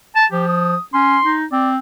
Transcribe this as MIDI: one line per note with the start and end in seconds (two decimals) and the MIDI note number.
0.16 0.25 81
0.32 0.75 53
0.32 0.44 67
0.47 0.80 87
0.94 1.18 61
0.94 1.34 84
1.24 1.45 63
1.52 1.78 60
1.52 1.69 74